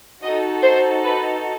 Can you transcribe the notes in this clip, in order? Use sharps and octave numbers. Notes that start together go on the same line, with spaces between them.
D#4 F#4 A4 D#5
C5
B4